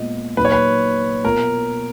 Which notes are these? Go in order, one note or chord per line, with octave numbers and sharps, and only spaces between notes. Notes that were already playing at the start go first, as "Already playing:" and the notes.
Already playing: A#2 G#3 B3 F4 D#5
A#2 F#3 A#3 D#4 B4
C#5
B4
B2 A#3 F4 A#4